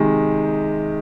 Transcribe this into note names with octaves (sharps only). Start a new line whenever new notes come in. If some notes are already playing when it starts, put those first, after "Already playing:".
Already playing: C3 D#3 G#3